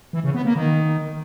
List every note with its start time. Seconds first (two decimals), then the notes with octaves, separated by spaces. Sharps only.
0.13 E3
0.24 C#3
0.34 B3
0.45 A#3
0.56 D#3